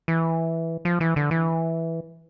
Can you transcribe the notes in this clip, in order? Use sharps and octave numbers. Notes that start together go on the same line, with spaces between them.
E3
F3
E3
D3
E3